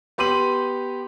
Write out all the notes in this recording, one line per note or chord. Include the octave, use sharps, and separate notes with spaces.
B3 G4 C6 D#7 F#7